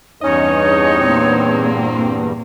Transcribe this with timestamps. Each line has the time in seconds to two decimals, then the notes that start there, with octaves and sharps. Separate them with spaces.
0.21 E2 G2 C#4 D#4 C#5 D#5
1.00 A#2 A#3 C4